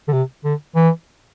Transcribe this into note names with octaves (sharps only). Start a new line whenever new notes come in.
D3
C3
D3
E3